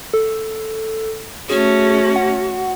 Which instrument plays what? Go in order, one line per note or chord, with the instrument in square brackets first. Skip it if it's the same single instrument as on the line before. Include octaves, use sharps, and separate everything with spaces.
[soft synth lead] A4
[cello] A3 C#4 [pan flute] F#4 [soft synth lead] G#4
[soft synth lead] F#5